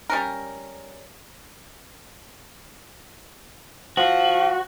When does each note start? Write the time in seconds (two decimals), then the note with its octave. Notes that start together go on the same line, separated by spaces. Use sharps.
0.10 G3 C#4 A#4
3.97 F3 F#4